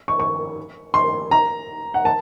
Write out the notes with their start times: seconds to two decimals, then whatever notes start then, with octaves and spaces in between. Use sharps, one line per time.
0.08 C#6
0.20 C#6
0.94 C6
1.31 A#5
1.94 F#5
2.05 A5